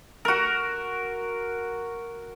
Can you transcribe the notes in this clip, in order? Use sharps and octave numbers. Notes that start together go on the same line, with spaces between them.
F#4 A#4